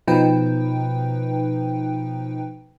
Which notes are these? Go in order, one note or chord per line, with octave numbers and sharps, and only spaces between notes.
B2 F3 D#4 B4 G5